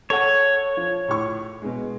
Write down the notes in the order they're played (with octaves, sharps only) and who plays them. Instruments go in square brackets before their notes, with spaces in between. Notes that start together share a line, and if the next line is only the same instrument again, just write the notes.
[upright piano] A4 F#5 [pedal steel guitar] C#5
[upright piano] F3
A2 C#6
B2 G#3